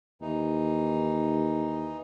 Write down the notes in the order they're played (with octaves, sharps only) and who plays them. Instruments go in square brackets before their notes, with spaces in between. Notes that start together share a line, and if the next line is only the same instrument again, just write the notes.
[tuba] D#2 [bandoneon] E3 D#4